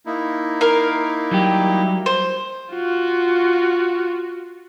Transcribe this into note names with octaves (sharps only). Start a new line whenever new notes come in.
A#3 D#4 E4
A#4 F5
F#3 G3 G4
C5
F4 F#4